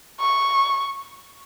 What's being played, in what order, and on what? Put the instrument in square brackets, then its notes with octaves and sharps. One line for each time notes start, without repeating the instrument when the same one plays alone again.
[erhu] C#6